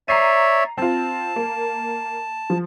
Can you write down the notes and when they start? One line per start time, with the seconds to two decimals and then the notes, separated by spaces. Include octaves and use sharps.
0.08 C#5 D5 E5 A#5 C7 D#7
0.78 C4 F4 A5
1.36 A#3
2.50 F3